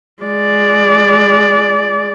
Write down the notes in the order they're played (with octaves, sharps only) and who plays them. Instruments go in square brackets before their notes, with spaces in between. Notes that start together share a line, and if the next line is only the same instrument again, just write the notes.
[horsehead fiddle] G#3 D5